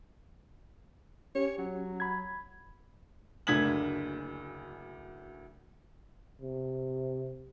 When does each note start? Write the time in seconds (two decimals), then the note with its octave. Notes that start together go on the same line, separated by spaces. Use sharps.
1.35 C#4 G4 C#5
1.58 F#3
2.00 B5 G#6
3.47 F#1 D2 D4 G#6 B6 F#7
6.42 C3